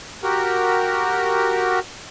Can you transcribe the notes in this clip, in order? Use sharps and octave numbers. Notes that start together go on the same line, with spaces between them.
F#4 G4 A#4